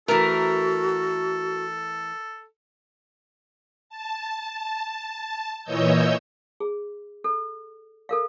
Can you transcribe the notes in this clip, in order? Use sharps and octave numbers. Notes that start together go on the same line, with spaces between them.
E3 A3 F#4 A4 A#4
A5
A#2 E3 C#5 D#5 E6 G6
G#4
A4
A4 A#4 F5